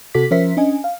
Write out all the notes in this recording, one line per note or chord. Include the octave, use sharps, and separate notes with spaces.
C3 F#4 A4 D6 B6
F3 C#4 A#4 C5 E5 B6
C#4 D4 D#5 G#5
F5